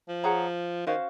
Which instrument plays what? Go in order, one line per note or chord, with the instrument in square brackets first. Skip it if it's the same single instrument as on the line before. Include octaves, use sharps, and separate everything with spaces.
[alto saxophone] F3
[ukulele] G#4 C#5 F#5 A#5
[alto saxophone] D#3 [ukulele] C#4 F#4 C5 F5